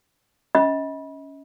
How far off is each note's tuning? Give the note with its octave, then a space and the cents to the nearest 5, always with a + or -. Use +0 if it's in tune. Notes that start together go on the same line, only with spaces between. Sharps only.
C#4 +10 D#5 +40 B5 -25